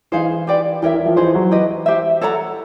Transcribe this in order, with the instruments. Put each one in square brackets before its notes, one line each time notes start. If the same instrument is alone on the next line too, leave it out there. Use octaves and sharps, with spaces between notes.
[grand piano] E3 [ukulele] D#4 G#4 C5 F5
[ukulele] G4 B4 D5 G5
[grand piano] E3 [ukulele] G4 A#4 C#5 E5
[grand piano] E3
F3
[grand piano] E3 [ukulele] D#4 G#4 C5
[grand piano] F#3
[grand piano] E3 [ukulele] G4 B4 D#5
[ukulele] G4 C5 E5
A4 C#5 F#5 A#5